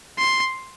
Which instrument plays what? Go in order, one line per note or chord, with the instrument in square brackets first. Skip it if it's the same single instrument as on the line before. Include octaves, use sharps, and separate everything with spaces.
[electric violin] C6